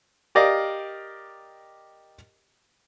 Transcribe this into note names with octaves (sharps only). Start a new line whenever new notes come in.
G4 A#4 D5 D#5 F5